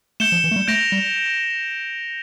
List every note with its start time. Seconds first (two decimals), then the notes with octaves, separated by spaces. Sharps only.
0.20 A3 G6 C#7 E7 G7
0.32 F3
0.44 E3
0.51 A3
0.56 G3
0.68 A3 G6 A#6 D7 F7
0.92 G3